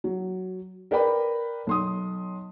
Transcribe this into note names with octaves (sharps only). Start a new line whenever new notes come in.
F#3
A#4 B4 D5 G5 B5
B1 C6 D#6